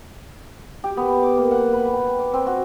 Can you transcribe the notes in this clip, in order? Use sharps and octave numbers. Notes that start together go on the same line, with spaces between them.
G4
B3
D6
A#3
F#5
B4
G5
D6
C4
F#4